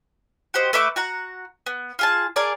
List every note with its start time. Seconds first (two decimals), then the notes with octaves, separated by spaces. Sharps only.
0.54 F#4 G4 C5 D#5
0.73 A3 B4 E5 D6
0.96 F#4 F#5 A#5
1.66 B3
1.99 F4 G#4 A5
2.36 G#4 A#4 D5 A5